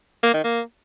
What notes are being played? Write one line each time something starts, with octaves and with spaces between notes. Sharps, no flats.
A#3
D#3
A#3